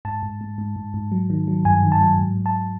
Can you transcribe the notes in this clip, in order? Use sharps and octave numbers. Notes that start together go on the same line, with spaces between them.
G#2 A5
G#2
G#2
G#2
G#2
G#2
F#3
D#3
F#3
G2 G#5
D#3
A5
F#3
G#2
G#2
A5